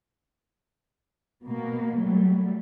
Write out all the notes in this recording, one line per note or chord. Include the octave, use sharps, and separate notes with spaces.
B2 A#3
F#3 G3 A3